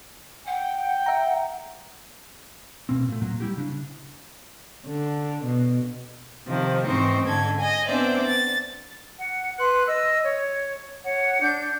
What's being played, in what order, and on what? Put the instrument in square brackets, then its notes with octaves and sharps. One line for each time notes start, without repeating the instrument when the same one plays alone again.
[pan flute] F#5 [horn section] G5
[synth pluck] E5 A#5
[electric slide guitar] B2 A#3 C4
A#2 A3
A#2 F#3 A#3
G3 E4 G4
C#3 D4
[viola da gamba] D3
B2
[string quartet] C3 D#3 F3
G#2 E3 C4 D#4 C5 C#6
G#2 D3 A4 G#6
D#5 G#5
B3 C4 D4 C5 D5 E5
A6
[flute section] F#5
B4 C6 F#6
D#5 E6
C#5
C#5 F#5
D4 G6